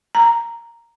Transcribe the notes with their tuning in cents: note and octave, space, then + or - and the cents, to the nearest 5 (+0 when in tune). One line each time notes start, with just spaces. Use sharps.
A#5 -5